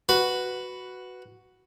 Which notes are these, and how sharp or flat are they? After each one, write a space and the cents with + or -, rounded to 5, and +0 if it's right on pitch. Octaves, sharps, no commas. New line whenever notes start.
F#4 +0 B4 +0